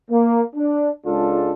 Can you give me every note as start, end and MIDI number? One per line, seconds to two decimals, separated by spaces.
0.11 0.42 58
0.56 0.90 62
1.06 1.53 37
1.06 1.53 56
1.06 1.53 62
1.06 1.53 65
1.06 1.53 69